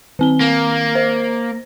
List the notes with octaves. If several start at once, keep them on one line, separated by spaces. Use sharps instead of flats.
D#3 C4 G7
A#3
C5